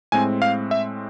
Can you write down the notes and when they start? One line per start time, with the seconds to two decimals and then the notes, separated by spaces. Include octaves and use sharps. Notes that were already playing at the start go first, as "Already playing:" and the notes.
0.12 A2 G#3 C4 G#5
0.42 F5
0.71 E5